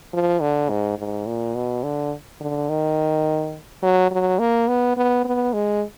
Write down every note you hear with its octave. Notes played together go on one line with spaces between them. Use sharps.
F3
D3
G#2
G#2
A#2
B2
D3
D3
D#3
F#3
F#3
A#3
B3
B3
B3
G#3